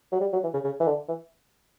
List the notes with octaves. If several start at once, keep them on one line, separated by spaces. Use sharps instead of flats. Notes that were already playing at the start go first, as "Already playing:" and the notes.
F#3
G3
F#3
E3
C#3
C#3
E3
D3
E3